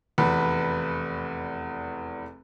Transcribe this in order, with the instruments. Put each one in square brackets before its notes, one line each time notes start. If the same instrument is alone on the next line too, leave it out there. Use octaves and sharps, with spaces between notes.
[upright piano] F1 E2 B4